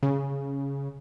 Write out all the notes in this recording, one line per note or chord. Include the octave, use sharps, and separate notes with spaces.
C#3